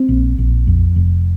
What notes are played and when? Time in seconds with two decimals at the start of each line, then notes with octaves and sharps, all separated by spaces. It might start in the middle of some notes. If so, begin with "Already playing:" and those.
Already playing: C4
0.09 A#1
0.38 A#1
0.67 F2
0.96 F1